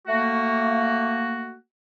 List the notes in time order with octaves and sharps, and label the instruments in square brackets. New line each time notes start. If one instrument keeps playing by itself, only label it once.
[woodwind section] A3 A#3 F#4